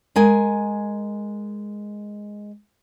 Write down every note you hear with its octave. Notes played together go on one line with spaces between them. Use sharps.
G#3 A#4 G#5